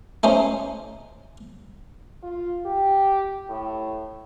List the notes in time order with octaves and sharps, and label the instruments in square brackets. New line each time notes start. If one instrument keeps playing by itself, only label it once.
[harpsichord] A3 C#4 D#4 C5
[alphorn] F4
G4
A2